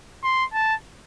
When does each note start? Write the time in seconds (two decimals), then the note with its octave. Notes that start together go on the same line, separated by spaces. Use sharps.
0.24 C6
0.53 A5